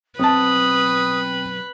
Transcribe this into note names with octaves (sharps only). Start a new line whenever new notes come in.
B1 C4 B4 A5 D#6